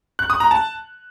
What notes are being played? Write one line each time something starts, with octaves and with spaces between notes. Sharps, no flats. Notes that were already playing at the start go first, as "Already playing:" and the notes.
F#6
D#6
A#5
A5